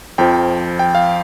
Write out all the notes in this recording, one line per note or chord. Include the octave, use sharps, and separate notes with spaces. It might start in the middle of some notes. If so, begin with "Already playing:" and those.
F2 F3 G5
G5
F5